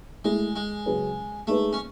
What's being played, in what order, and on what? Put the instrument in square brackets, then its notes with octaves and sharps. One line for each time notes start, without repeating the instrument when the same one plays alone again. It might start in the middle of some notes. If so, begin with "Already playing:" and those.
[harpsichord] G#3 [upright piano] A3 E4 G#4
[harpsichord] G#3
[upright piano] C#3 F#3 C#4 G#4 B4
[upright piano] G#3 D#4 G#4 B4 [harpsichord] A3
[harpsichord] C#4